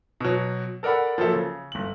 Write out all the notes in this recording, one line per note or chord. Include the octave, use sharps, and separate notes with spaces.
B2 F#3
A4 A#4 D5 F#5 B5
F3 F#3 A#3 A4 E5
C#3
G1 F#7